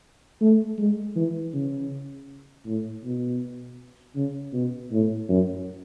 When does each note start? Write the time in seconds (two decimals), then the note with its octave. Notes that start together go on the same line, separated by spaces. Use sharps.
0.41 A3
0.78 G#3
1.16 E3
1.53 C#3
2.66 A2
3.04 B2
4.16 C#3
4.53 B2
4.92 A2
5.29 F#2